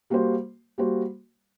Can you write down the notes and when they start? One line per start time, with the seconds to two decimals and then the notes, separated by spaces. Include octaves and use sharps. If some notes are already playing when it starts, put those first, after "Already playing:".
0.10 G3 A#3 F#4 C5
0.78 G3 A#3 F#4 C5